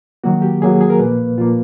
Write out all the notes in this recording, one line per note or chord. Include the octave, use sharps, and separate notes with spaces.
D#3 F#3 A#3 F#4
G4
D#3 F#3 A#3 G#4
G#4
A#4
A#2 F3 A#3 B4
A#2 F3 A#3 F4